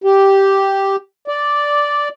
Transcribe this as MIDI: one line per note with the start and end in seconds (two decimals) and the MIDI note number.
0.04 0.96 67
1.28 2.08 74